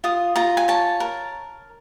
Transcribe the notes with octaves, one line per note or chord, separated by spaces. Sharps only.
F4 D#6
F4 A#5
G#5
C#5 A5
A#4